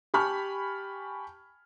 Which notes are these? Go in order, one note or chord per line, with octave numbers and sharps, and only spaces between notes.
G4 G#5 A5 B5 C#6 F6